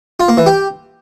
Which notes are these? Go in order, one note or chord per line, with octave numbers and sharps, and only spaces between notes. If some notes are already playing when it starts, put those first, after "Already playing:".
F4
A#3
E3
G4